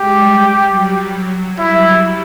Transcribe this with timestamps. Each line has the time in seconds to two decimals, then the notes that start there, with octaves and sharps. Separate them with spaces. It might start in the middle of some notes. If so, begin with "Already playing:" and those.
Already playing: G#3 G4
0.24 G3
0.69 F#3
1.14 F#3
1.59 G3 E4